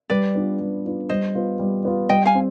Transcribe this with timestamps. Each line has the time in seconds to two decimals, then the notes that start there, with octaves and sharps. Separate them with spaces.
0.10 G3 B4 D5
0.35 B3 D4 F4
0.60 G3
0.85 B3 D4 F4
1.09 G3 C5 D#5
1.35 B3 F4
1.59 G3
1.85 B3 F4
2.09 G3 D#5 G5
2.26 F5 G#5
2.35 C4